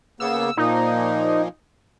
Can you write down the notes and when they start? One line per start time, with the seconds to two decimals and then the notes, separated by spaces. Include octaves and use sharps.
0.20 C#3 A#3 B3 E6
0.57 A#2 F3 A#3 D#4